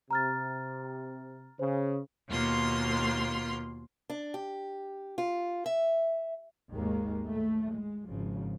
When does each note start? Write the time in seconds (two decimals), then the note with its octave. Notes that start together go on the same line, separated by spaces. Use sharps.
0.11 C3 A#5 F6 A6
1.59 C#3 C5
2.29 D#2 B2 A#3 F4 C6
4.10 D4
4.34 G4
5.18 F4
5.66 E5
6.71 G#1 D#2 D#3 G#3 A#3
7.28 A2 A3
7.73 G#3
8.08 G#1 C#3 F3